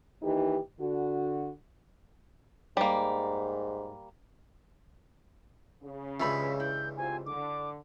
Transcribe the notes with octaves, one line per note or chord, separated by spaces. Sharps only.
D#2 E3 D#4 G4
D3 F#4
G#2 G3 A#3
C#3
C#2 G2 E3 F4 C#5 B5 B6
E4 G6
C3 F4 C5 G#5
D3 D6